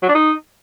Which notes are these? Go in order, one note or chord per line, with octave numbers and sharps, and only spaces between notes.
F#3
D4
D#4